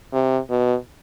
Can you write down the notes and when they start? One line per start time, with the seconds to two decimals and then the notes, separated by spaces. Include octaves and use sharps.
0.13 C3
0.50 B2